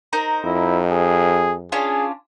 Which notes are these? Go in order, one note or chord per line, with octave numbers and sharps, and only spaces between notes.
D#4 A#4 C5
F2 E4
G#4
C#4 D4 F4 G#4